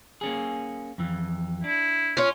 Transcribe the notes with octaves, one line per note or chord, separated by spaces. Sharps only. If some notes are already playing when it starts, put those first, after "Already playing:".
A#3 C#4 G#4
F2 E3
D4 E4
C#4 F4